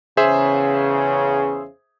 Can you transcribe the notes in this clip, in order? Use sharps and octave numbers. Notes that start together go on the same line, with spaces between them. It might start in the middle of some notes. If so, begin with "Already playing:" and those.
E2 C#3 G#4 C5 E5